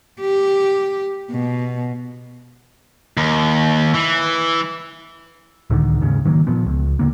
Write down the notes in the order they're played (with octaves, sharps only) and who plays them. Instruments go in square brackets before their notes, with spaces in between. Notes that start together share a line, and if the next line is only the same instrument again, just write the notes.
[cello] G4
B2
[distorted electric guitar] D#2
E3
[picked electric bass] C#2 A2 D3 D#3
D#2 G#2 C#3
D#3 F#3 A3 A#3
A#2 F3 B3
C#2
D#2 D3 A#3